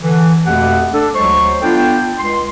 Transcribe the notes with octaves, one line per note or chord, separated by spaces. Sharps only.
D3 E3
F2 B2 A3 A#3 G4 F#5
D4 A4
D2 F#3 G#3 A3 C5 C#6
B3 D4 F4 A4 G5
C#2 C6